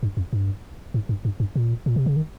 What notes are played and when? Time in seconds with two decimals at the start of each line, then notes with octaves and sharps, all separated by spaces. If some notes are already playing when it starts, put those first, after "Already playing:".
0.03 G2
0.17 F2
0.33 G2
0.94 G#2
1.09 G2
1.25 G2
1.40 G2
1.56 A#2
1.86 A#2
1.96 C3
2.06 C#3
2.16 D#3